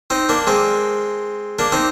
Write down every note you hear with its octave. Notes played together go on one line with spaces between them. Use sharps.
C4 D#4
A#3 D4
G#3 C4
A#3 D4
C4 D#4